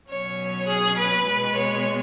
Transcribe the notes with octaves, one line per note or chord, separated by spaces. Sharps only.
B2 F#3 C#4 C#5
G#4
B4
B2 G#3 B3
C#5